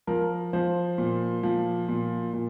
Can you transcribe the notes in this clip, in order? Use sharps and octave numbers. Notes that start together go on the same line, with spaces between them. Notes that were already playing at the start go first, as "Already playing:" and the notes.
F3 A#4
F3 C5
A#2
F3
A#2
A#2